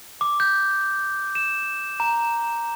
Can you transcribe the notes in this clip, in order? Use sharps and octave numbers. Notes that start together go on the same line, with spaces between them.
D6
G6
E7
A#5